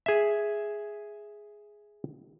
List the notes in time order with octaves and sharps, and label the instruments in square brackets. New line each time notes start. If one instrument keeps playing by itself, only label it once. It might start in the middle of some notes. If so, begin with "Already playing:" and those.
[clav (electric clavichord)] G#4 E5